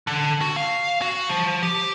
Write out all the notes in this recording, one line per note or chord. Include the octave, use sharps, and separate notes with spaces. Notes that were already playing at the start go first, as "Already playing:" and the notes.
D3
F#4
F5
F#4
F3
G4